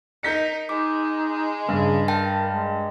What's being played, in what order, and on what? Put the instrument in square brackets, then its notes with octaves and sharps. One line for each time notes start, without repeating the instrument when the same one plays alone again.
[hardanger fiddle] D#4 A#4 [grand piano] G6 B6 C#7
[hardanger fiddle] G#3 [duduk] D#4 [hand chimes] D6
[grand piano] G2 [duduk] C#3
[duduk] A#4 [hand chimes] G5 A5
[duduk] G#3